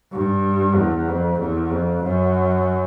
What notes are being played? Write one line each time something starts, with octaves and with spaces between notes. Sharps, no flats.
G2
E2
F2
E2
F2
F#2